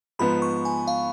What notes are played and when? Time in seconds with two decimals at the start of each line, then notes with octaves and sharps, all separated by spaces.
0.19 G#2 F3 B3 B5
0.42 C#6
0.65 G#5
0.87 F5